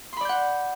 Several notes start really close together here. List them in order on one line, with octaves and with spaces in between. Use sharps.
C6 B5 D5 G6 F#5